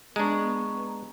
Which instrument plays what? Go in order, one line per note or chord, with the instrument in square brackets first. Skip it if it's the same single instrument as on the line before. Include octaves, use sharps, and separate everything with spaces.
[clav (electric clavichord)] G#3 D4 [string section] B3 [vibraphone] A#5 C#6